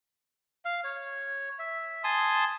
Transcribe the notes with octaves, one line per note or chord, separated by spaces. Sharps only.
F5
C#5
E5
G#5 A5 C6 D#6